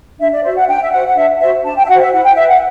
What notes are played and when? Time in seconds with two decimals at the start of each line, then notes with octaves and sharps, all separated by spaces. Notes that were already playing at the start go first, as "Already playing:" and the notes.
0.19 D4 E5
0.32 D5
0.43 F#4 C5 E5
0.56 F#5
0.67 D4 G5
0.82 E5
0.91 F#4 C5 F#5
1.07 F#5
1.16 D4 E5
1.40 F#4 C5 E5
1.64 D4 A5
1.77 G5
1.84 E5
1.88 F#4 F#5
1.93 C5
2.01 E5
2.12 E4 F#5
2.24 G5
2.36 B4 E5
2.48 F#5